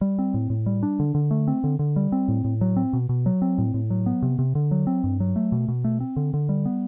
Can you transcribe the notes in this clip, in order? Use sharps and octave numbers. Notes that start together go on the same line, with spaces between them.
G3
C4
A2
A2
G3
D4
D3
D3
A3
C4
D3
D3
G3
C4
A2
A2
F#3
C4
B2
B2
F#3
C4
A2
A2
F#3
B3
C3
C3
D3
F#3
C4
G2
F#3
A3
B2
B2
A3
C4
D3
D3
G3
B3